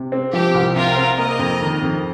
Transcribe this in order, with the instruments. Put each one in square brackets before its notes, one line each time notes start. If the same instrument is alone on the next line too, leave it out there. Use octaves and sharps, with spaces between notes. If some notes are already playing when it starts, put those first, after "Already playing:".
Already playing: [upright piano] C3
C4
[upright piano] F3 [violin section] G4
[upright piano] C2
[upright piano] C3 [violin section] F4 A#4
[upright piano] C4
[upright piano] A#3 [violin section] A#4 D#5
[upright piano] F2
D#3
F2